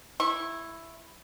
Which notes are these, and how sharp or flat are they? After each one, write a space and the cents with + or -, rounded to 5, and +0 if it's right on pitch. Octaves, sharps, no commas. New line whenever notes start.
E4 +5 C#6 -30